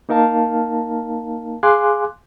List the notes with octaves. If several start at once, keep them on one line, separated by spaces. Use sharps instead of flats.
A#3 D#4 A#4 F5 A5
G#4 F5 G#5 C6 D6 F#6